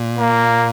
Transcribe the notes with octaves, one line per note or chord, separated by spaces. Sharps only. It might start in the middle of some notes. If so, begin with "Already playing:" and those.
Already playing: A#2
A#3